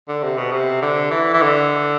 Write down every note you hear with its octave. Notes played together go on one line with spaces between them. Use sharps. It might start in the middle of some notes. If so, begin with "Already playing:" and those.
D3
C3
B2
C3
D3
E3
E3
D3